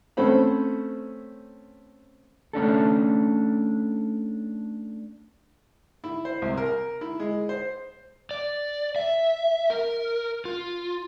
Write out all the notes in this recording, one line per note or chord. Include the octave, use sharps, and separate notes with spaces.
A3 C4 C#4 A4 C5 B5
A3 C#4 D4 A4
E4
C5
C2
A#4
E4
G#3
C5
D5
E5
A#4
F4